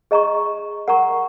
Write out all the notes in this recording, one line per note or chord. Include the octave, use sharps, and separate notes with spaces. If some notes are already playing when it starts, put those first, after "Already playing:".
G#4 D#5 A#5 C#6
A#4 F#5 A#5 C#6